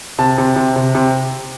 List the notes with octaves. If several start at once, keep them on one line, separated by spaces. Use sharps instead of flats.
C3 A5
C3
C3
C3
C3